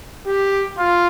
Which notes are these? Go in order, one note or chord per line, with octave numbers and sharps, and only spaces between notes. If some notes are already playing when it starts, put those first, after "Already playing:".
G4
F4